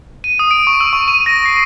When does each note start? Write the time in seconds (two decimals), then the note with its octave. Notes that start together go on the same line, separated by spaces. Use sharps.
0.24 D#7
0.39 D#6
0.51 D7
0.67 C#6
0.81 E6
0.93 C#6
1.08 D#7
1.26 A#6
1.45 C7